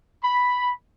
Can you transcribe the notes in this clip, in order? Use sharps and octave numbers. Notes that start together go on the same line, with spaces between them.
B5